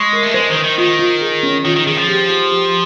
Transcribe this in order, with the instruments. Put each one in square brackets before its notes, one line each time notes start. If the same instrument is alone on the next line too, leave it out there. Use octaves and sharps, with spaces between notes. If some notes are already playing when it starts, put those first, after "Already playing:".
Already playing: [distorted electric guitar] G#3 [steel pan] C#6
[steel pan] A#4
[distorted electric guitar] A3
[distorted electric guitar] G#3 [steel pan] C5
[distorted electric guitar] D#3
[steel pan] C5
[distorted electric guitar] D#3
[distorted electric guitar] D#3 [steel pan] F4
[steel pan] F4
G#4
C#4
[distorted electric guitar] D#3 [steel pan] F4
[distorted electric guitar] D#3
[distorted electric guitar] D#3 [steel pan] G#4
[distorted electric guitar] F3
[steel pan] G4
G4
G4